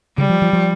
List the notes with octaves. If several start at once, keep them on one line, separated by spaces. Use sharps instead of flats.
C#3 G3
F3
F3
F3